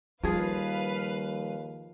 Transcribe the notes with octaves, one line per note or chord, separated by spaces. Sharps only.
D#2 F3 G3 G#4 B4 F5